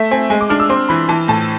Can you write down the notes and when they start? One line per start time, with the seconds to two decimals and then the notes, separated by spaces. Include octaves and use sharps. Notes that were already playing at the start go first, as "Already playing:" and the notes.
Already playing: A3 E5
0.11 C4 G#5
0.30 G#3 G#5
0.41 D6
0.50 D4 F6
0.60 E6
0.69 C4 C6
0.89 E3 B5
1.09 E3 A5
1.28 A2 A5